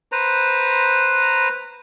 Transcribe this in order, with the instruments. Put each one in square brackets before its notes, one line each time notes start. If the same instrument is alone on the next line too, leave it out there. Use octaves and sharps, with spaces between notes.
[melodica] B4 C5 A#5